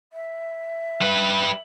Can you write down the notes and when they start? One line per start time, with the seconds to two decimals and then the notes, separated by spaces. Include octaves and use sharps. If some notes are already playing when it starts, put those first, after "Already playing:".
0.13 E5
1.01 G3 B4